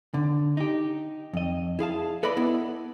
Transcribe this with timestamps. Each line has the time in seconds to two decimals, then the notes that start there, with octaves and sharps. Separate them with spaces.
0.14 D3
0.57 D#4 G4
1.33 F2 D#5
1.79 E4 G#4 F5 A5
2.23 A4 B4 D5 D#5 B5
2.37 B3 E4